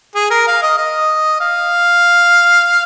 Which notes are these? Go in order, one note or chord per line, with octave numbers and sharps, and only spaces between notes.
G#4
A#4
F5
D#5
D#5
F5